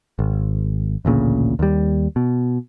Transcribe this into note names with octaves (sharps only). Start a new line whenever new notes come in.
G#1
A1 D2 A#2 C#3
D#2 G3
B2